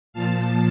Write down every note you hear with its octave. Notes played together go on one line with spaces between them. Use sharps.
A#2 F3 F5 A5